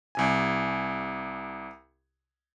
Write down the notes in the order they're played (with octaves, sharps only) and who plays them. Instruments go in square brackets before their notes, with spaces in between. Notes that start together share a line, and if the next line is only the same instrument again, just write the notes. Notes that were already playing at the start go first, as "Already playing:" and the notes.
[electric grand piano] C2 C3 G#5